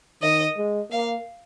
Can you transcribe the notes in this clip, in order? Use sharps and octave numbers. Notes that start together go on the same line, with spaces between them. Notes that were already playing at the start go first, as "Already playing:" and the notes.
D#3 D#5
G#3
A#3 F5